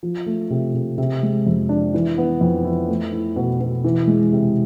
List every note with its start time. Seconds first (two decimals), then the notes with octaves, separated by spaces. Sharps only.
0.03 F3
0.26 A3
0.50 C3
0.74 C3
0.98 C3
1.23 G#3
1.47 F2
1.69 D4
1.94 E3
2.18 B3
2.41 F2
2.65 E4
2.89 A3
3.12 E4
3.36 B2
3.61 B2
3.84 E3
4.08 G#3
4.32 C3